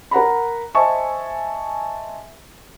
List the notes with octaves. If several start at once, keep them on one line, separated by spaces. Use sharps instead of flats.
A#4 F#5 A#5 B5
C5 D#5 E5 G#5 A5 C#6